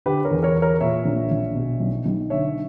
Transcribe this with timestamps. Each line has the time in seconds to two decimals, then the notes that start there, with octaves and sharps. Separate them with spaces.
0.06 D3 G4 B4
0.25 A#4 C#5
0.31 E2
0.43 A#4 C#5
0.55 E2
0.62 A#4 C#5
0.81 A#2 C#5 E5
1.05 A#1
1.31 A#1
1.55 B2
1.80 B1
2.06 B1
2.30 D3 C#5 E5